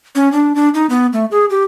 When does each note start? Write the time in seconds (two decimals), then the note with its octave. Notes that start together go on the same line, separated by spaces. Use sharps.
0.15 C#4
0.32 D4
0.55 D4
0.74 D#4
0.90 B3
1.13 A3
1.31 G#4
1.50 G4